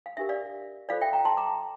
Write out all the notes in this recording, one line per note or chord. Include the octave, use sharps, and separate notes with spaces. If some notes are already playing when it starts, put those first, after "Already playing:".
F5
D4 G4 A#4 E5
D5 F5
F4 A4 C5 D5 F5
E5 G5
G5 A#5
A5 C6
A#5 D6